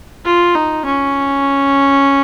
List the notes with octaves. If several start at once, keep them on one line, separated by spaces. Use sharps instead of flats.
F4
D#4
C#4